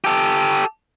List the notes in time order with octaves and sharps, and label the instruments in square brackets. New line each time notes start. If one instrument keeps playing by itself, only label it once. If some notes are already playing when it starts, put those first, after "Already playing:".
[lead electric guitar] G4 A4